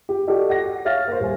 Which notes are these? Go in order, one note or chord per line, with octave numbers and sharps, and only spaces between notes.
G4
F#4 G4 A4 D5 D#5
F#5 A#6
C#5 E5 F5 F6 A6 A#6
A#3 C5
D#1 G#5